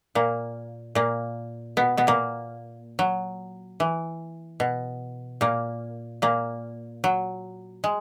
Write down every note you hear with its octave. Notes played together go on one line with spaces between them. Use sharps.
A#2 A#3
A#2 A#3
B2 B3
B2 B3
A#2 A#3
F#3
E3
B2
A#2 A#3
A#2 A#3
F#3
G#3